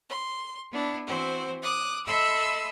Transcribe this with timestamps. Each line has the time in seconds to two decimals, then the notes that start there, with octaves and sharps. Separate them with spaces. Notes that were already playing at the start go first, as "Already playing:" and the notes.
0.10 C6
0.72 B3 D4 E4
1.07 E3 C4 F#4 C5
1.63 D6 D#6 F#6
2.06 A4 D#5 E5 B5 C6 E6